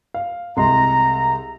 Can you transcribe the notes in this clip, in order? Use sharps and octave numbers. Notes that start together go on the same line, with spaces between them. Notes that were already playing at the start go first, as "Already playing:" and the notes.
F5
C2 G#3 A#5 C6